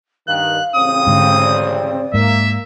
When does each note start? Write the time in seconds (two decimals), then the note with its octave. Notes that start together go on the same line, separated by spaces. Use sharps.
0.28 G2 D#3 F5 F#6
0.76 A1 C#3 C4 D#6
1.07 G#2 D3
1.43 D5
2.14 G#2 A#3 E5